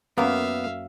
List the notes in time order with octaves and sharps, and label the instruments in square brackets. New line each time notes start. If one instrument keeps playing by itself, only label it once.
[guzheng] F#2 A#3 [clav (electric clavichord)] B3 [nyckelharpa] E5 F5